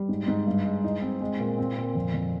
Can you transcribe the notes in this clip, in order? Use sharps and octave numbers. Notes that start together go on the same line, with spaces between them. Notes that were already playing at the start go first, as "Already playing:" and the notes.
Already playing: G3
G#2
G#2
G2
G#3
D#4
C4
G#3
A#2
C4
A#2
F2
F2